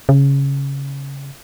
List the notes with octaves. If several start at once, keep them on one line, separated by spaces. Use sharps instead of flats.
C#3